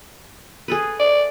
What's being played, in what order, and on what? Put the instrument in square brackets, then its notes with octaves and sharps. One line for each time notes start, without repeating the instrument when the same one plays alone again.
[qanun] G#4 A4 B4
[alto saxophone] D5